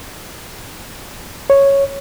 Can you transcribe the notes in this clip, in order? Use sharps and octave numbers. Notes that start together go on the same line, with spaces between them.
C#5